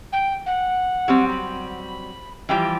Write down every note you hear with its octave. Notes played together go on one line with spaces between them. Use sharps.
G5
F#5
F#3 G3 C4
B5
E3 F3 G3 G5